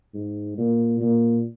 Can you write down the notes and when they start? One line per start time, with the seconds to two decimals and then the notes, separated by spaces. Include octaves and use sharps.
0.14 G#2
0.58 A#2
1.01 A#2